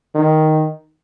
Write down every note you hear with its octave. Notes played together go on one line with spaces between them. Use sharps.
D#3